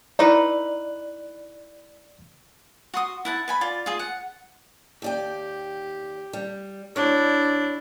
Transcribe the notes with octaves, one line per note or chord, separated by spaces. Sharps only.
D#4 E4 B4 D5
F#4 C6 D#6
E4 F#5 A5
B4 G#5 B5
F4 D5
F4 G#4
F#5
D#2 G4 D5 G5
G3
D2 D4 E4 C#5